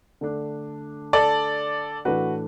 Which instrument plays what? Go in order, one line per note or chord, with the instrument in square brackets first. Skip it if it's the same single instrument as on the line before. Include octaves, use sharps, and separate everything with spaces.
[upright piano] D3 A3 D4
A4 D5
A2 E3 A3 D4 F#4 B4